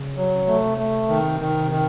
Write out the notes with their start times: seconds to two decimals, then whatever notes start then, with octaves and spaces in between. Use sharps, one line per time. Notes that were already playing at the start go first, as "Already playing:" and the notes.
Already playing: C#3
0.17 F#3
0.47 C3 A3
0.78 A3
1.09 D#3
1.40 D#3
1.71 D#3